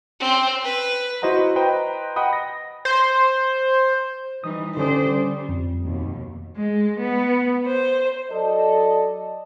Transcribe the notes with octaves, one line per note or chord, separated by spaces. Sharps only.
C4
B4
E4 F#4 C5 D#5 F#5 A#5
B4 C5 D#5 G5 A#5
D#5 F#5 G5 B5 D#6
A#6
C5
E3 G3 D#4 D#6
D3 C#4 G4 C5 D5 D#6
G3
F2
D#2 B2
G#3
B3
C5
F#3 A4 D5 D#5